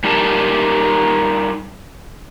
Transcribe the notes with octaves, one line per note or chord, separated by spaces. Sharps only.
G3 D#4 G4 A#4 F5 A5